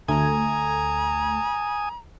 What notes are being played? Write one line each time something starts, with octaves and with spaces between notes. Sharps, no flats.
D2 A3 G#5 A#5 D#6 G#6